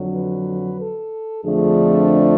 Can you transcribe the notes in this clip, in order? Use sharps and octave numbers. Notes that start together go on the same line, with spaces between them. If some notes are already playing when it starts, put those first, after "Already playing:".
Already playing: F2 D3 F#3
B4
A4
F2 D3 F3 A3 D4 G#4